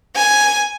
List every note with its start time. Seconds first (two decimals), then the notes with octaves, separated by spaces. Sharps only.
0.16 G#5